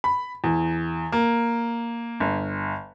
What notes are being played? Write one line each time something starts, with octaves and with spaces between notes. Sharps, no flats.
B5
E2
A#3
G1